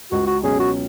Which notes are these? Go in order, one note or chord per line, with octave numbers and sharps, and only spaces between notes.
C#2 F#4
F#4
B2 F#3 C#4 G#4
F#4